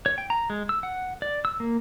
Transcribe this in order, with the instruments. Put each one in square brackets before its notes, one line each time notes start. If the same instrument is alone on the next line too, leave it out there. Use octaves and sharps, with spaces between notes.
[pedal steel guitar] C#5
G5
A#5
G#3
E6
F#5
D5
E6
A#3